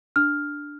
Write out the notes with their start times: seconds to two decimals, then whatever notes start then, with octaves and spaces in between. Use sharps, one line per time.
0.16 D4 F6